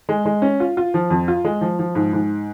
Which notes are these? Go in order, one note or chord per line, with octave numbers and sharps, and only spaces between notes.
G#3
G#3
C#4
F4
F4
F3
F2
F4
G#3
F3
F3
G#2
G#2